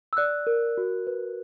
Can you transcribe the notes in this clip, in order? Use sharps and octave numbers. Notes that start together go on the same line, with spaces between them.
E6
D5 F#6
A#4
F#4
B4